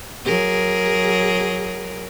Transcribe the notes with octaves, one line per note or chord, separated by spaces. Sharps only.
F#3 G#4 A#4